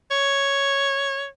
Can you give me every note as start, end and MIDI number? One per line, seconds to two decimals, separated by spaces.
0.11 1.27 73